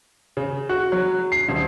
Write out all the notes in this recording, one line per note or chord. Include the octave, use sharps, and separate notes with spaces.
C#3
F#4
F#3
C7
D#1